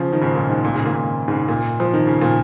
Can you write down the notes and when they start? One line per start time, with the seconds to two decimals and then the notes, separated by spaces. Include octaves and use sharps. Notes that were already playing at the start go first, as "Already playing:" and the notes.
Already playing: C#3 F3
0.13 D#3
0.21 G#2 C#3
0.35 A#2
0.50 G#2
0.64 A#2
0.74 G#2 C#3
0.85 A#2 D#3
0.95 A#2
1.28 G#2 C#3
1.48 A#2
1.80 F3
1.94 D#3
2.07 C#3
2.21 A#2